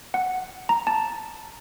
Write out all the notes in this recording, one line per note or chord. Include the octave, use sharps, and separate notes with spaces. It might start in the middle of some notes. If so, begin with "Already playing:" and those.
F#5
A#5
A5